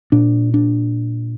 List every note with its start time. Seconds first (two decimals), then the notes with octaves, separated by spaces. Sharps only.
0.12 A#2 D4
0.54 D4